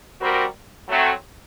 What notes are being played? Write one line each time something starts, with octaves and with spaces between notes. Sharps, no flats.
G3 C4 F#4 A#4
F#3 A3 C4